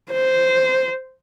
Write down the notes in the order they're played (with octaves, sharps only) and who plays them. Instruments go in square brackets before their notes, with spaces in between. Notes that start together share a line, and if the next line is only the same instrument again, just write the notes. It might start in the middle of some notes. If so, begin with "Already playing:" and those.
[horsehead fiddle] C5